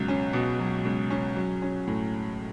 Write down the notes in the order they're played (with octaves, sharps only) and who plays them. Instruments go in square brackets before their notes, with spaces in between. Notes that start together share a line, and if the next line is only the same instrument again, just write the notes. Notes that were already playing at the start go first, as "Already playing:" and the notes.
Already playing: [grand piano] C#2 B2 F#3
C#4
B2
F#3
C#2
C#4
F#3
C#4
A2